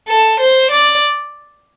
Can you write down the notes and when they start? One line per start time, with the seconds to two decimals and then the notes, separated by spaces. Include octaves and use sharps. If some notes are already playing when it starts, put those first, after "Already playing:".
0.08 A4
0.41 C5
0.71 D5